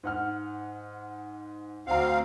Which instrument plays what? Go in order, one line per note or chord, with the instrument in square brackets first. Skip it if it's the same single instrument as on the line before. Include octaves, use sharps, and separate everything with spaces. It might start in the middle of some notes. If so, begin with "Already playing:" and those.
[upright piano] G#2 F#5 F6
[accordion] D2 C4 F5 [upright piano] F#5 A#5